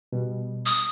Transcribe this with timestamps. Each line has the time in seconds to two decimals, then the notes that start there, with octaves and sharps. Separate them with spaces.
0.12 B2 G3
0.66 D#6